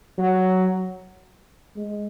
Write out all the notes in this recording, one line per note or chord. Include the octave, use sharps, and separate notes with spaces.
F#3
G#3